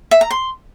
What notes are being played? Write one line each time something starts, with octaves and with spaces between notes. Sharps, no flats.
E5
A#5
C6